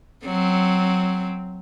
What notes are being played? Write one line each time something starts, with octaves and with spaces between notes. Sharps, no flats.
F#3 C4